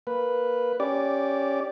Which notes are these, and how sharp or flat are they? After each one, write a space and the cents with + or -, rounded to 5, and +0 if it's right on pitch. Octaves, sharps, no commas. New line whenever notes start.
A#3 +0 B4 +0
C#4 +0 G4 +0 D5 -10